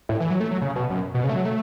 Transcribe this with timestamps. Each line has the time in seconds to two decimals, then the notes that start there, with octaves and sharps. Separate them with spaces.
0.09 A2
0.20 E3
0.30 F#3
0.40 A3
0.51 F#3
0.61 C#3
0.76 B2
0.90 F#2
1.14 B2
1.24 C#3
1.29 A3
1.35 F#3
1.45 A3